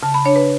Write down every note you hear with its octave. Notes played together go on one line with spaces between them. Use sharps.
C#3 A5
B5
D4 C#5
B4